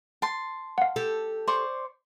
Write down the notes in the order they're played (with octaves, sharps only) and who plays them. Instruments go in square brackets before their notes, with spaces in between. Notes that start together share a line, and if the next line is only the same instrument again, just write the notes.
[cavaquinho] A5 C6
[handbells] F5 F#5
[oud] G4 A4
[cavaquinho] C5 D5 C#6